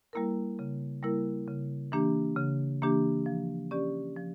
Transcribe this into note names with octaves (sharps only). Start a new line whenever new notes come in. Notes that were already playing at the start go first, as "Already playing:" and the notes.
G3 A#3 E4 A#4
C#3
G3 A#3 E4 A#4
C#3
E3 A#3 D4 G4
C#3
E3 A#3 D4 G4
F3
C#4 G4 D5
F3